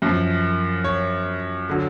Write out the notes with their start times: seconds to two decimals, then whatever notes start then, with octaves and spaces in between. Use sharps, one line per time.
0.02 F#2 F3
0.84 C#5
1.69 D3 F#3